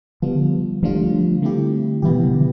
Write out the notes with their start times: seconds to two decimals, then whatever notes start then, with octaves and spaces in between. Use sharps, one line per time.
0.22 D3 F3 G3 B3 F4
0.83 D3 F3 G3 A3 D4 F4
1.42 D3 A3 C4 E4 G4
2.02 B2 E3 G3 B3 E4 G4
2.23 D3 F3